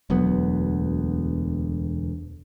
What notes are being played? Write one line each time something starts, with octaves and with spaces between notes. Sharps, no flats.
E1 D2 F#3 B3